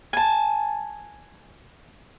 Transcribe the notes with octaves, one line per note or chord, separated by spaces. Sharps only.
G#5 A5